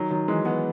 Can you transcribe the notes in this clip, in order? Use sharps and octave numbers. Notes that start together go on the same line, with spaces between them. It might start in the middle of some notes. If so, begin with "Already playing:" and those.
Already playing: D#3 F#3
D#3 F#3
E3 G#3
G#3 B3